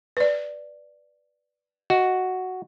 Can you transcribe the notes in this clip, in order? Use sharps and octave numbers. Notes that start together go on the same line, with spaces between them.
B4 D5
F#4 D#5